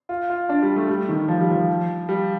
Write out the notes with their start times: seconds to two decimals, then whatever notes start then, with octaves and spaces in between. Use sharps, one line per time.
0.09 F4
0.30 F4
0.49 D4
0.62 G3
0.76 A3
0.89 G3
1.09 D#3
1.28 F3
1.40 G3
1.51 F3
2.09 G3